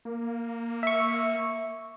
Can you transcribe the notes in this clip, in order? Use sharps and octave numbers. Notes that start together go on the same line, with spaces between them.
A#3
E5 C#6